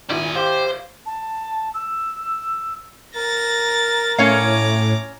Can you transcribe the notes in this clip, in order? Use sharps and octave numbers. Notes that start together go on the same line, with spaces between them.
G#1 A#2 G3 E4 G#5
G4 C5 F5
A5
E6
A#4 A6 A#6
A2 C#4 C#5 F5 A#5 D6